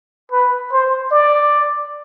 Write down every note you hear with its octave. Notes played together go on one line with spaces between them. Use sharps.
B4
C5
D5